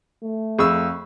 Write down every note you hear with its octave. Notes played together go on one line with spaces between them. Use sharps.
A3
F2 G#4 B5 C#6 E6